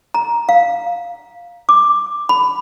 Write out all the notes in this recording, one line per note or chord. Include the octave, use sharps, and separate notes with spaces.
A#5
F5
D6
B5